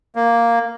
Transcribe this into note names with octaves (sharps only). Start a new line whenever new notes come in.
A#3